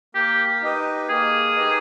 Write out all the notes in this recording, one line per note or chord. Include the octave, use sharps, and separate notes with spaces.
A#3 G4
D#4 G4 B4 D#5
A#3 G#4
D#4 G4 B4 D#5